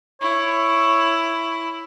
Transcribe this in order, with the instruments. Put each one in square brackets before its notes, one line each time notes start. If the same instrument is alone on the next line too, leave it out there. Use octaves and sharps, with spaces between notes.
[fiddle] E4 [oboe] C#5